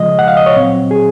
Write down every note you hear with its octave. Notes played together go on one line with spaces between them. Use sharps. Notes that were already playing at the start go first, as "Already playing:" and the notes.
Already playing: C#3 F3 G#3 D#5
F#5
F5
D#5
C#5
A#2 F#3 C4
G#4